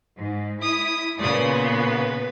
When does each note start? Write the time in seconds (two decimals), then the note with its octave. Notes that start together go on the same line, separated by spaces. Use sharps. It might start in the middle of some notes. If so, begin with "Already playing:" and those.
0.17 G#2
0.62 E4 D#6
1.19 A#2 C#3 B3 D5 D#6
1.49 B4